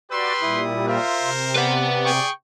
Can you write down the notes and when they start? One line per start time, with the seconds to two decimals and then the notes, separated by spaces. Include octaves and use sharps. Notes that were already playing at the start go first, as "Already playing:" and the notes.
0.11 F#4 G4 B4 D5 C6 E6
0.42 A#2 G3 E4 D#6
0.87 F4 A#4 C5 E5
1.22 C3
1.56 B4 D5 F#5
2.04 G#4 G5 C#6